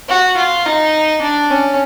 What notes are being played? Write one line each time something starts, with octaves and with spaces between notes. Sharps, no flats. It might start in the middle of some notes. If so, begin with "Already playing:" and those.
F#4
F4
D#4
D4
C#4